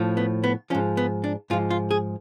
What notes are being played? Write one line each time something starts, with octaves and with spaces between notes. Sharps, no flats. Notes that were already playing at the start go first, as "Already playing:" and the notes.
Already playing: A2 F3
B3
B3
G#2 F3 C#4
B3
D4
G#2 F3 F4
F4
G#4